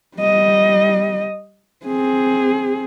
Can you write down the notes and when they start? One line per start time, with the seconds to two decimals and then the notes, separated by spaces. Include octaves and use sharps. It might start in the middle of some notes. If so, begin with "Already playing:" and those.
0.17 G3 D#5
1.85 C4 G#4